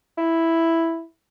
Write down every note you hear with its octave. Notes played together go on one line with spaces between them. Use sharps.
E4